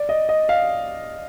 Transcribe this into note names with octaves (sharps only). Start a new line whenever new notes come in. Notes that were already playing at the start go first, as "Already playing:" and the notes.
Already playing: D5
D#5
D#5
F5